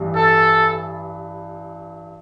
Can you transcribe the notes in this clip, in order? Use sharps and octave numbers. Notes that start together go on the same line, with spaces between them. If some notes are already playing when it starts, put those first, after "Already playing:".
Already playing: A1 G2 E3 G3
A4